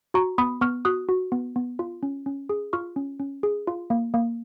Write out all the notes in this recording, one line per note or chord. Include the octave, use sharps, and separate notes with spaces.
F#4 A#5 C#6
B3 B5 D#6
B3 C#6 F6
F#4 D#6 F#6
F#4
B3
B3
F4
C#4
C#4
G#4
F4 C#6 F6
C#4
C#4
G#4
F4
A#3
A#3